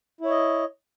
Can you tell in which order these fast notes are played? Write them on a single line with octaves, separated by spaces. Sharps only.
E4 C#5 D#5